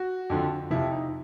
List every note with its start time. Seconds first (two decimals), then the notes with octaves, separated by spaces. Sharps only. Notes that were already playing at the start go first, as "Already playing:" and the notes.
Already playing: F#4
0.30 F2 D3 F3
0.71 F2 C3 F3 E4
0.91 D#4